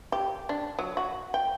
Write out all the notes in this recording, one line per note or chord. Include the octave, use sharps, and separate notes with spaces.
G4
D4
F#3
F#4
G5